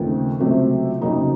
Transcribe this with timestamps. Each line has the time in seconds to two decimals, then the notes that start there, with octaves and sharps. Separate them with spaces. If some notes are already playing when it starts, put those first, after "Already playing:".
Already playing: D#2 C#3 F3 A3 C4
0.40 C#2 C3 F#3 A3 C4
1.01 F2 C#3 F#3 A#3 D#4